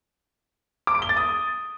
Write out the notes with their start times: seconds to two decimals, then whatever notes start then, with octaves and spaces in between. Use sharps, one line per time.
0.87 D6
0.95 D7
1.02 G7
1.09 A6
1.17 D#6